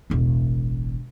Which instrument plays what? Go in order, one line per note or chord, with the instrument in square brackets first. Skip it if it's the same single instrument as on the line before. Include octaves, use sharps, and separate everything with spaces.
[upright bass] E1 A1